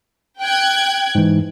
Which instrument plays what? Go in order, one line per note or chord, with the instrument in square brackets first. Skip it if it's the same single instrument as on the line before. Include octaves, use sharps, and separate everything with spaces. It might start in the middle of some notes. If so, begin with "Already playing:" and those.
[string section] G5 F#6 G#6
[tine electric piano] G#2 E3